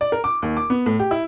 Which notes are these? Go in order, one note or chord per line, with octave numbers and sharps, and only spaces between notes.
D5
A#4
D6
D#2
D6
B3
A2
G4
E4